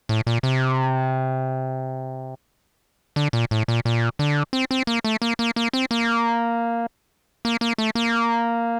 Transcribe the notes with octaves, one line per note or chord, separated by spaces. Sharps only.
A2
A#2
C3
D3
A#2
A2
A#2
A#2
D3
C4
C4
A#3
A3
A#3
A#3
A#3
C4
A#3
A#3
A#3
A3
A#3